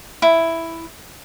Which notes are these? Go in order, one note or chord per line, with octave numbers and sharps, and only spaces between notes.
E4